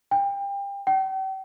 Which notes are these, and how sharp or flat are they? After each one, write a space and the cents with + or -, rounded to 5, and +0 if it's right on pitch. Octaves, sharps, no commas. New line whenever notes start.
G5 +30
G5 -40